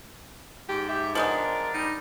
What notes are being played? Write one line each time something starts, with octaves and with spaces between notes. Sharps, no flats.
G#2 G4
G4 E5
F3 G#3 B3 D4 A#4
G3 D#4